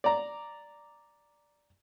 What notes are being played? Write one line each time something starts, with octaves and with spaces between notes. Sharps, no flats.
D5 A#5